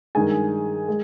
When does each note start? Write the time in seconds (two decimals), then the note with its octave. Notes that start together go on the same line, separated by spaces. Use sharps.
0.15 G2 D#3 G#3 G#5
0.88 G#3